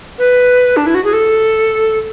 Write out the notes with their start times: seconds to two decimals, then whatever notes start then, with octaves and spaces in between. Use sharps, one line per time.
0.18 B4
0.76 D4
0.86 E4
0.94 F#4
1.04 G#4
1.13 A4